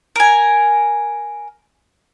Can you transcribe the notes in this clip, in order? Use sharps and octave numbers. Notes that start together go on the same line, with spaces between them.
A#4 G#5